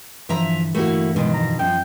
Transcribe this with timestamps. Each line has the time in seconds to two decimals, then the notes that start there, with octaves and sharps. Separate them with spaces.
0.29 G2 D3 E3 F3 E5 A#5
0.75 A3 A#3 E4 F#4
1.16 F2 B2 D#3 G#3
1.34 A#5
1.59 F#2 F3 G5